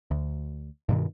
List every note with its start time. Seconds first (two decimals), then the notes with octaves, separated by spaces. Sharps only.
0.11 D2
0.89 G2 B2 D#3